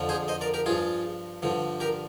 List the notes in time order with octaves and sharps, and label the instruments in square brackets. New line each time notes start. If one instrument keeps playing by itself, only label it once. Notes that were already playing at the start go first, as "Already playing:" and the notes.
Already playing: [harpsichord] F2 D3 F3
G#4 C5
C5 D#5
A#4 D5
G4 A#4
G2 F3 F4 G#4
G2 D3 F3
G4 A#4